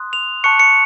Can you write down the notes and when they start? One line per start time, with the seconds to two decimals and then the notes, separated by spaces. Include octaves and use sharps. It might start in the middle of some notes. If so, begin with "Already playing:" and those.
Already playing: C6 D#6 F#6
0.13 F7
0.44 A5 C#6 F#6 C#7
0.60 C#7